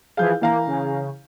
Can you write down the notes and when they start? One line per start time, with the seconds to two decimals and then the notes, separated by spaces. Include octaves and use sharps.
0.17 E3 F3 G#4 F5 G6
0.41 E3 A#3 F5 A#5
0.67 C#3